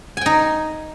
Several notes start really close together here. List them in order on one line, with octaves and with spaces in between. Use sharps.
G#5 G5 D#4